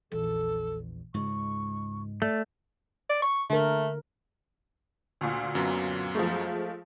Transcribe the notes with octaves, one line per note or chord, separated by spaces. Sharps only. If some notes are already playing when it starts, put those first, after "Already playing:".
A#1 E2 A4
C#2 G#2 G#3 C#6
A3 D5
D5
C#6
D3 A3 A#4
D2 A#2
F#2 F#3 B3
F3 G#3 A3